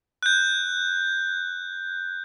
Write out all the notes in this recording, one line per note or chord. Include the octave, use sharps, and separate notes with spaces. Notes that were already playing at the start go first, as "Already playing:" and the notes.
F#6 G6